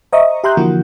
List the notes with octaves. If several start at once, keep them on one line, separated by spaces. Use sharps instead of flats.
C5 D#5 E5 A#5 C#6 D#6
G4 E5 A#5 C6 F#6 G6
D3 E3 F3 A#3 E4 F#4